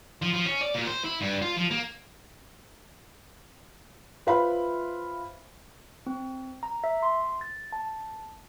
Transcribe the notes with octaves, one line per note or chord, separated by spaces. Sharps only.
F3
F3
C#4
D5
A#2
C5
E4
G2
F4
F3
A#3
F4 B4 C5 E5 F5 B5
C4
A#5
E5
C6
A6
A5